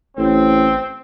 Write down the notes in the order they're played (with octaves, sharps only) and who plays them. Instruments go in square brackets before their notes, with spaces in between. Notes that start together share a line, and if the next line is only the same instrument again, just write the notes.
[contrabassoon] A1 [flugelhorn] C4